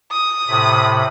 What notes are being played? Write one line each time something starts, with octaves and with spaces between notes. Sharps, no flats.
D#6
A2 C3 B5